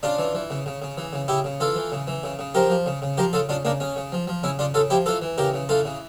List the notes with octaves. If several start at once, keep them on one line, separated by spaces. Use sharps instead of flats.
C#3 D4 F4
E3
E3
C#3
C#3
C#3
E3
C#3
C#3 E4 G4
C#3
E3 F4 A4
E3
C#3
E3
C#3
C#3
F3 G4 A#4
F3
C#3
C#3
F3 G4 A#4
C#3 F4 A4
C#3 D4 F4
C#3 A#3 D4
C#3 C#4
C#3
F3
F3
C#3 C#4 E4
C#3 D4 F4
C#3 F4 A4
F3 E4 G4
E3 F4 A4
E3
C#3 G4 A#4
C#3
E3 F4 A4
C#3